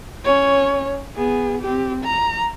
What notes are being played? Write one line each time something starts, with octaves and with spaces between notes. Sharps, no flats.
C#4 C#5
B3 G#4
C4 G4
A#5